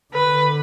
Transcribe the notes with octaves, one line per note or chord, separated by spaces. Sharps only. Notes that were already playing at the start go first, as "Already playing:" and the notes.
D3 B4